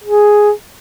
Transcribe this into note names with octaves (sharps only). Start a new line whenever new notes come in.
G#4